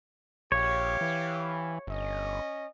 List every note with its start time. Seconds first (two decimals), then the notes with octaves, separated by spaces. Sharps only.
0.52 A#1 G4 C#5 F5
1.01 E3
1.87 G1 C#4 D#5